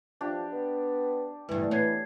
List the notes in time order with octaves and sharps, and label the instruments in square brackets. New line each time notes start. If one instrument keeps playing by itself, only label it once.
[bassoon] F3 [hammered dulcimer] D4 G4
[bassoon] B3
[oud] D2 G2 [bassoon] E3 [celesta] B4
[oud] B3 [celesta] C#5 G#6 C7